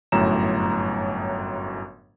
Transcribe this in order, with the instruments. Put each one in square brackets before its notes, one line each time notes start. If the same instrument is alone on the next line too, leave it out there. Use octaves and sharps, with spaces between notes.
[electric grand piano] G1 F#2 A2 C#5 A#5 E7